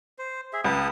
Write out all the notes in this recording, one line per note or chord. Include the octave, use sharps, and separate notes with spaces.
C5
G#4 E5
C#2 B4 A5 D#6